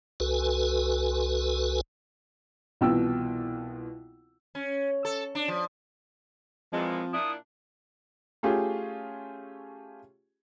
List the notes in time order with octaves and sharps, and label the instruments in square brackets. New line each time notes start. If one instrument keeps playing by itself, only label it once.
[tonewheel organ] C2 F#4 A4 B4 G#5
[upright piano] C2 B2 E3 F4 G5 E6
[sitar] C#4
A4
D4
F3
[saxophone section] A#2 E3 G#3 [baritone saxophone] F3 [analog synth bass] C4
[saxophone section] A#2 D4 E4 [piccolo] D#6
[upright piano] A3 C#4 F4 G4 G#4